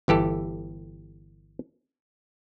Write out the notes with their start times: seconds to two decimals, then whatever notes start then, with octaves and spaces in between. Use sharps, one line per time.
0.08 G1 E3 G4 A4